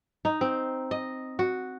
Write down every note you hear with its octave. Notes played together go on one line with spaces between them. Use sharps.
D#4
C4
D#5
F#4